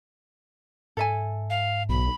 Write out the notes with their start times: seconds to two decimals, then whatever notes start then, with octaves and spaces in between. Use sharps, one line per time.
0.97 G#2 A4 E5 G#5
1.50 F5
1.89 B1 B5